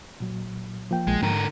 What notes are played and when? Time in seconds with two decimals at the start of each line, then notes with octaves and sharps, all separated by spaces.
0.20 A#2 F#3
0.91 F3 A#3 G5
1.07 A#1 G#3
1.23 G#2 D3 A#4